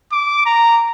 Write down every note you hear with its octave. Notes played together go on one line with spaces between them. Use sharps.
D6
A#5